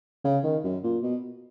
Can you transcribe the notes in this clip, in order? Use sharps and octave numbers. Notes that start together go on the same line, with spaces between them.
C#3
D#3
F#2
A#2
B2